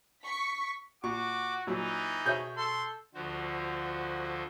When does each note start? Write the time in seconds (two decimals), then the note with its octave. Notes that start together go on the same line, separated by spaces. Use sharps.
0.23 C#6 B6
1.04 A#2 F#4 C#6 D6
1.67 A#2 E3 F#3 D#4
2.25 B2 G#4 C#5 E5 G6
2.57 A4 C6
3.15 D2 D3 F3 F#4 C5